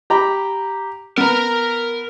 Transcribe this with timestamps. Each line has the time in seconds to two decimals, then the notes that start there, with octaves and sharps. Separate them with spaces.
0.10 G4 A#5 B5
1.18 B3 A#4 B4 A#5